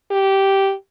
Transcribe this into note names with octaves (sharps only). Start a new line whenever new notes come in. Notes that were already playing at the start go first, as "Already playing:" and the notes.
G4